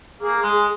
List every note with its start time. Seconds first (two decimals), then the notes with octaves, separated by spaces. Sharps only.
0.21 A#3 G#4
0.38 G#4
0.43 G#3
0.53 G#4